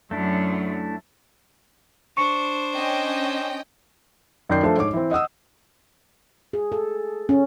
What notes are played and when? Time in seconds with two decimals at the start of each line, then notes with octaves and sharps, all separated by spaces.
0.11 F#2 F#3 A3 D4 E4
2.17 D4 C5 C#6 C#7
2.75 C#4 D#5 G5
4.49 F#2 D#3 D5 G6 C7
4.63 F3 A3 D4 A4 C5
4.77 G#2 C#5 D6
4.93 E3 C4
5.11 D#5 F#5 D#6 E6
6.53 G#4
6.72 A4
7.29 C#4